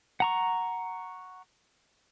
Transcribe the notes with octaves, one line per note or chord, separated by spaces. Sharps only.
F#5 A#5 C#6